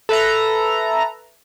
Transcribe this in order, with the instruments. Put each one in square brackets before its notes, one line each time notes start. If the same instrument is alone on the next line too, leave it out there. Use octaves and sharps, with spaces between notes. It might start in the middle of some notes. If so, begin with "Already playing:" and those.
[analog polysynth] A4 B4 E5 A#5